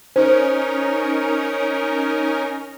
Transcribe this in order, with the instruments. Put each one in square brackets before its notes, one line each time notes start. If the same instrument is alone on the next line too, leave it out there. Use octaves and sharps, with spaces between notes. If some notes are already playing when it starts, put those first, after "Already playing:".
[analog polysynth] C#4 D#4 A#4 [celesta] C5